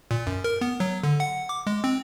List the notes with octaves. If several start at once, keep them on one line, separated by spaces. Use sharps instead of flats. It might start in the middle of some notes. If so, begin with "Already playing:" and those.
A#2
F#2
A#4
B3
F#3
D3
F#5
D6
G#3
C4